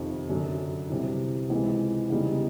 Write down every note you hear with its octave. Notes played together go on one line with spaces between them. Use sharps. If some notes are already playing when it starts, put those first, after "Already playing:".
Already playing: F2 C3 D#3
F#2 D3 F#3
C2 C3 E3
C#2 C3 E3 G#3
C#3 E3 G3 B3 D#4